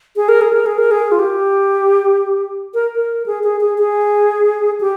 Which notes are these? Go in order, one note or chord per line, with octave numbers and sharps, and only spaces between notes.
G#4
A#4
G#4
A#4
G#4
A#4
G#4
F4
G4
A#4
A#4
G#4
G#4
G#4
G#4
G4